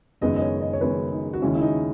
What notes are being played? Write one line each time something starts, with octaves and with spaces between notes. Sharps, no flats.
F#1 F#2 D#3 G#3 B3 D#5
D#5
C#5
D#5
C#5
F#1 F#2 D#3 G#3 B3 B4
D#4
F#4
D#2 C#3 G#3 C#4 E4
E4
D#4